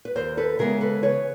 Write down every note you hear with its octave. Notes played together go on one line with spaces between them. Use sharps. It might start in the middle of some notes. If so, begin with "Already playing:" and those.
B4
D#2 A#4 C5
A4 B4
C#3 E3 G#3 B3 G#4 A#4
A4 B4
C#3 B4 C#5